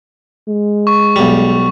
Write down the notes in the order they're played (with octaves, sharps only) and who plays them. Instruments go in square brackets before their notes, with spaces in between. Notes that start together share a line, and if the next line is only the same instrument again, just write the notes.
[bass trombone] G#3
[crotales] C#6
[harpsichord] B1 G3